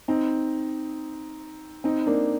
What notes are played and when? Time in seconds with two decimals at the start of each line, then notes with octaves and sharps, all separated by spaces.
0.08 C4 D#4
1.84 C4 D#4
2.06 A#3 D4